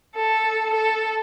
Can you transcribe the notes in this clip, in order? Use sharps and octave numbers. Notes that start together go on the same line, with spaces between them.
A4
A4